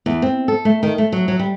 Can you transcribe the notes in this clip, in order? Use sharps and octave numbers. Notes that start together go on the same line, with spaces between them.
E2
C4
A4
A3
D#3
A3
F#3
F#3
G3